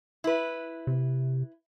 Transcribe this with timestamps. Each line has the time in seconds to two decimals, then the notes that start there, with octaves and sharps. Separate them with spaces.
0.24 E4 B4
0.87 C3